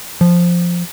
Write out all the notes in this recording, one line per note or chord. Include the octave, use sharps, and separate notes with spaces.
F3